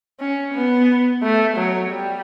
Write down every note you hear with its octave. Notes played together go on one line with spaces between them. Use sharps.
C#4
B3
A3
F#3
G3